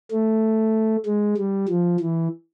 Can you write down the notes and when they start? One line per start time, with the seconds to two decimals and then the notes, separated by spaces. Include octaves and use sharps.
0.12 A3
1.06 G#3
1.37 G3
1.69 F3
2.00 E3